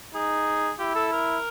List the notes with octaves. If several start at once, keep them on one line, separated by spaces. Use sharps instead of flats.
D#4 G#4
E4 G4
A4
A#4